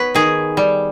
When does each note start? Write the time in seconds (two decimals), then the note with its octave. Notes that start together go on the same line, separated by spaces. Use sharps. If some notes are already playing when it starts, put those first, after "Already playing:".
Already playing: B3 B4 C#5
0.15 D#3 G#4
0.57 G3